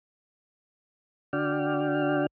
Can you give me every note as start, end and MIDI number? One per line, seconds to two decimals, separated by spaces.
1.33 2.26 50
1.33 2.26 62
1.33 2.26 66
1.33 2.26 74
1.33 2.26 79
1.33 2.26 89